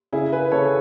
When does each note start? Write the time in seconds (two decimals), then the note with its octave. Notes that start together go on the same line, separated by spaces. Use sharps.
0.13 C#3 E4 G#4
0.32 G#4 B4
0.51 C#3 A4 C#5
0.65 G#4